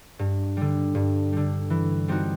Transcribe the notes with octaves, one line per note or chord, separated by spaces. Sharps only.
G2
D3 G3
G2
D3 G3
E3
G3 C4 D#4 F#4